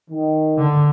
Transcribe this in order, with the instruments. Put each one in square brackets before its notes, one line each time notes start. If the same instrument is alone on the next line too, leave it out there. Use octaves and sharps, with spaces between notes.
[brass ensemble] D#3
[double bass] D3